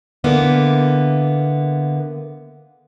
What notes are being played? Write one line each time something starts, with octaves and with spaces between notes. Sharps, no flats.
D3 A#3 B3 E4